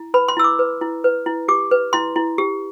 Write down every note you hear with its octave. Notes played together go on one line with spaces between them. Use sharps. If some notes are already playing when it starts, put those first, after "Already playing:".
Already playing: E4
B4 B5
C6
E4 E6
D6
B4
E4
B4
E4
G4 D6
B4
E4 C6
E4
G4